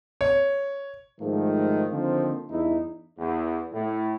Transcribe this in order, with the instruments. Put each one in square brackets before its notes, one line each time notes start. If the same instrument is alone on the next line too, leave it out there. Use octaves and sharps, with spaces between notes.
[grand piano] C#5
[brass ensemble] G#2 D#3 F3 A3 A#3
D3 D#3 F3 A#3 C4
E2 G2 D#4 E4
[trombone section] E2
A2